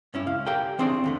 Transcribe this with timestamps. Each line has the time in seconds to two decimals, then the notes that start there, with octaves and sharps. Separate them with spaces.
0.14 G2 C#4 E4
0.27 C#2 F5
0.46 G4 A4 A#4 D5 F5 G5
0.79 E3 C4 D4 G#4 C#5 D5
1.04 D#2 D3 A3